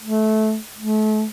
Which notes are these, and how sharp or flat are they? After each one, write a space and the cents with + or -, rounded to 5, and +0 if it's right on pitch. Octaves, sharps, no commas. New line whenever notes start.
A3 -20
A3 -35